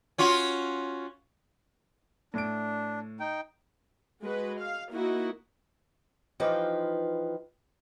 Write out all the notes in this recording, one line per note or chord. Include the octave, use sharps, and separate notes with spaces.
C#4 F4 F#4
A2 D4 D7
D#4 G5
G#3 F#4 B4
F5
A#3 D#4 E4 F#4
E3 F3 D#4 F4 G4 B4